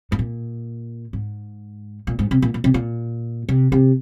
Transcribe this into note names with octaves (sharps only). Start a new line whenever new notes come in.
G#2
A#2
G#2
A#2
G#2
C3
A#2
A#2
C3
A#2
C3
C3